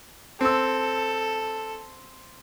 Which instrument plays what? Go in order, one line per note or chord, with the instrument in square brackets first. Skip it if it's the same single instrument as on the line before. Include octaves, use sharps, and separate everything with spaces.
[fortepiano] C4 E6 [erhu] A4